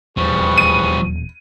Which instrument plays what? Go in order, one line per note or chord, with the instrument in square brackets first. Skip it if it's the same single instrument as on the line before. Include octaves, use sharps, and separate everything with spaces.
[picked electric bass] D#1 E2 [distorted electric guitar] F3 G3 [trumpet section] G#4 B4 C#6
[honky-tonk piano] D#7